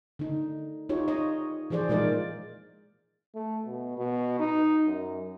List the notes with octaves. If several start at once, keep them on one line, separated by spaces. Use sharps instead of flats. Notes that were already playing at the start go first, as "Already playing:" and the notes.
D3 D#4
D#4 F4 G4 C#5
D#4 C#5 D#5
E3 F3 G#4 C5 D5
A#2 G#3 D#4 F4 A#4 D5
A3
B2
B2
D#4
F#2